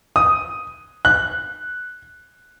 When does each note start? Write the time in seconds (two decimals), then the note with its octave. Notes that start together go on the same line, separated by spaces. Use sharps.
0.16 D#6
1.05 F#6